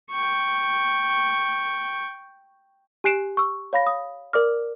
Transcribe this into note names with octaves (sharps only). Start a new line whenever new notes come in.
G5 C#6
G4 G#5 F#6 C7 D7 E7
C#6 E6
C#5 F5 B5 A#6
D#6
A#4 D5 D6 F6